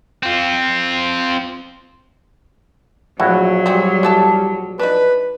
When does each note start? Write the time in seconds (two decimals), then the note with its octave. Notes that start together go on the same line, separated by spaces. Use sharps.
0.23 C4 F4
3.20 A#1 F#3 A3 E4 F#4
3.66 G3 C4 G4 G#4
4.03 E3 A4 A5
4.79 D4 D#4 B4